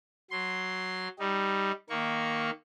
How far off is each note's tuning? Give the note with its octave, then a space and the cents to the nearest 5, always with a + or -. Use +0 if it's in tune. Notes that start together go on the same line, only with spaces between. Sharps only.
F#3 +0 C6 +0
G3 +0 D#4 +0
D#3 +0 A#3 +0 C#6 +0